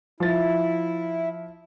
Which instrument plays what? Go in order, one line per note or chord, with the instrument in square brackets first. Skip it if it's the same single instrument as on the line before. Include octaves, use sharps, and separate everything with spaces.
[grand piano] F3 A6 [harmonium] E4